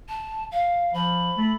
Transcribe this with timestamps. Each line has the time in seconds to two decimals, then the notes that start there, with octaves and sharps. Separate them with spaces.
0.08 A5
0.52 F5
0.94 F3 B5
1.37 A3